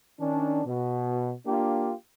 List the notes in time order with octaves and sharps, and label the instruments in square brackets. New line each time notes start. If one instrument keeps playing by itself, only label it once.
[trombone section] D#3 C#4 D4
B2
A#3 D4 F4 G4